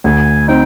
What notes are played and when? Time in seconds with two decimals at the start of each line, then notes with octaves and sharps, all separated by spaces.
0.04 D2 G#5
0.48 C4 D#4 G5